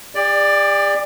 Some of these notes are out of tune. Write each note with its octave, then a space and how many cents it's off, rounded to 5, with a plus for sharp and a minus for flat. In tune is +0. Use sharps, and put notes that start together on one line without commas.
G4 +45 D5 +10